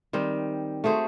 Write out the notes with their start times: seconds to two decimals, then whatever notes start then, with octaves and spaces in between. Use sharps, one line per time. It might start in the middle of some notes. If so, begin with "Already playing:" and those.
0.13 D#3 G3 C4
0.84 A3 F#4 G#4 C5